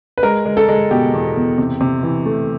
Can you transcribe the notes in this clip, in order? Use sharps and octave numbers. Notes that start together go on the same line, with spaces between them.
B4
G#3 A#4
G#3
A4
G#3
B2 G4
E2
E2
C3
C3
E3
A3